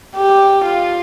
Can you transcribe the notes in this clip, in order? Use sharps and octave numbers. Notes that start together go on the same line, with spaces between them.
G4
F4